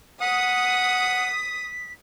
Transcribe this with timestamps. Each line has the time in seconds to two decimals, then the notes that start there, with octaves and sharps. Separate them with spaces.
0.21 F#5 D#6 B6